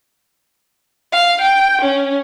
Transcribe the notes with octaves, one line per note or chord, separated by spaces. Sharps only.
F5
G5
C#4